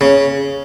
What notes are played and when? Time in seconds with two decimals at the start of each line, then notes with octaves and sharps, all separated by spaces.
0.01 C#3